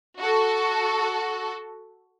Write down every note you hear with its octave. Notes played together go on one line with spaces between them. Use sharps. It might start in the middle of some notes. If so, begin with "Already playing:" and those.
F#4 A4